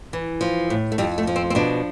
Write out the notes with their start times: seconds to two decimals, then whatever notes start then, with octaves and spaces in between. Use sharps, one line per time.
0.13 E3
0.41 F3
0.70 A2
0.92 A3
0.98 F2 G3
1.18 A3
1.27 F3
1.36 C4
1.50 C4
1.55 B2 D4